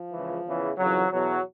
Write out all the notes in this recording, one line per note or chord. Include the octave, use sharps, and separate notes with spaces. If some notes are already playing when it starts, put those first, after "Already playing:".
Already playing: F3
C#2 C#3 E3
E2 C#3 E3
F2 C#3 E3 F#3
E2 B2 F#3